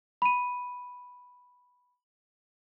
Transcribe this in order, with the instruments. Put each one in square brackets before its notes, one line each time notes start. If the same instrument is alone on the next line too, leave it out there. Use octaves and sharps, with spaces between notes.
[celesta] B5 D#7